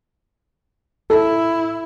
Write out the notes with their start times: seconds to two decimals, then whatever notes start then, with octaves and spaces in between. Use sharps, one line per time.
1.10 E4 A4